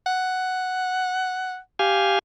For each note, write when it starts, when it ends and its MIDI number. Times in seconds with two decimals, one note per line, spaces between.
0.06 1.58 78
1.79 2.19 67
1.79 2.19 77
1.79 2.19 80